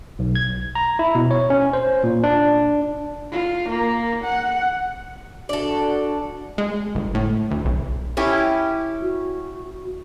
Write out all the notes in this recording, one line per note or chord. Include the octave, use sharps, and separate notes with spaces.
B1
G#6
A#5
E4
B2
C#5
C#4
C5
A#2
D4
F4
A#3
F#5
D4 F#4 A4 D5
G#3
G1
A2
D2
B1
C#4 E4 G4
F#4